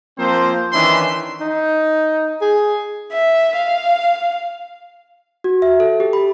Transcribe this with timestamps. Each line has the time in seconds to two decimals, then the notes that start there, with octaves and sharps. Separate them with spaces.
0.18 F3 A#3 C4 C5
0.73 D#3 E3 C#4 D4 E5 C6
1.41 D#4
2.41 G#4
3.12 E5
3.56 F5
5.44 F#4
5.62 E5
5.80 A4
6.00 G4
6.13 B5